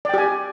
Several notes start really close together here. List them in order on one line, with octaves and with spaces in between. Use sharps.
D5 G5 G4 G#5